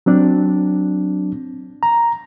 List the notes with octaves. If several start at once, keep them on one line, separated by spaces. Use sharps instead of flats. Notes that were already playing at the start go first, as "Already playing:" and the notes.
F#3 C4 D4
A#5